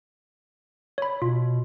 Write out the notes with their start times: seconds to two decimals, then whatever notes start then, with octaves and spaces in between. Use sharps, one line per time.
0.98 C#5 B5
1.22 B2 F4